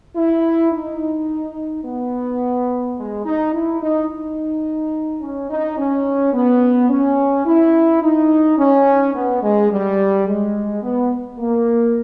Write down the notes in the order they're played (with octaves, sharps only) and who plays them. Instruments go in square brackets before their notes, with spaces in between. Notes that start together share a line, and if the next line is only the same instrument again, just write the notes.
[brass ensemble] E4
D#4
B3
G#3
D#4
E4
D#4
D#4
C#4
D#4
C#4
B3
C#4
E4
D#4
C#4
B3
G#3
G3
G#3
B3
A#3